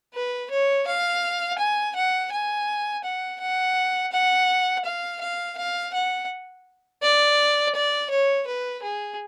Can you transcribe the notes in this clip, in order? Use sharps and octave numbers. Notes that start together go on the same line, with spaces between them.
B4
C#5
F5
G#5
F#5
G#5
F#5
F#5
F#5
F5
F5
F5
F#5
D5
D5
C#5
B4
G#4